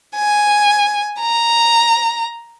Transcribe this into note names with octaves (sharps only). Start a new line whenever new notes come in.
G#5
A#5